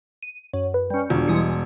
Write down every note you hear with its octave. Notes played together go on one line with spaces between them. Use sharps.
D#7
F#2 C#5
B4
G3 C#4
E1 D4 F4
E3 G3 G#3 D#6 C#7